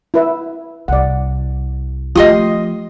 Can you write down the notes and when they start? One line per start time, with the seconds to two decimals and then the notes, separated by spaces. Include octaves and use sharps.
0.14 E4 B4 E5
0.88 C2 D5 F#5
2.15 F3 A3 F4 G4 D#5 C6 D#6